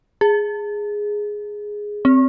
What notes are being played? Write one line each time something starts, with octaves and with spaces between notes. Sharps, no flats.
G#4
C4